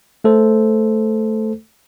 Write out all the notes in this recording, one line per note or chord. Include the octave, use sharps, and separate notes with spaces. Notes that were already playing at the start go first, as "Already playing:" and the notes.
A3 A4 C5